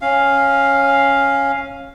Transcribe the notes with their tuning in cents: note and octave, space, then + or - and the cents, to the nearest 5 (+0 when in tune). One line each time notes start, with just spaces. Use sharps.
C#4 -10 F5 +0